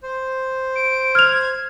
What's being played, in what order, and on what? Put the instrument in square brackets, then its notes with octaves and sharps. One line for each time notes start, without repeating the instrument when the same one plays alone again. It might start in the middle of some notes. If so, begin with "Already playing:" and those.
[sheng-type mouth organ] C5
[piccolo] D7
[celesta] F6 F7 [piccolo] G#6